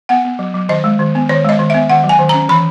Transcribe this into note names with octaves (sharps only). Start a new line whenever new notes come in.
B3 F#5
B3
F#3
F#3
D#3 D#5
G#3
D#3
B3
D#3 C#5
G#3 D#5
D#3
B3 E5
D#3 F#5
F#3
G#5
D#3
C#4 A#5
E3 B5